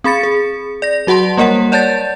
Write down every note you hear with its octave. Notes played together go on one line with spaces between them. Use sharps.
C4 G#4 B5 A6 C#7
G#4
D5 A#6
F#3 F#4 F#5 A5 C6
G3 A#3 A#4 C#5 F#5
C#5 D5 A5 G6 A6